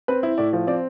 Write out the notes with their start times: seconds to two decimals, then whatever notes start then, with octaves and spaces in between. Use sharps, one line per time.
0.08 C4 B4
0.23 E4
0.38 A2 D5
0.53 F3
0.67 C4 D5